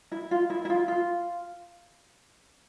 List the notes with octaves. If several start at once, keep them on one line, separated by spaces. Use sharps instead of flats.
E4
F4
E4
E4
F4
F4